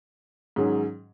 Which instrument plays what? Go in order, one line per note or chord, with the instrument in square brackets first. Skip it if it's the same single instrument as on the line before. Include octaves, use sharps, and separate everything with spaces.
[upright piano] G#2 D#3 F#3 C#4 G#4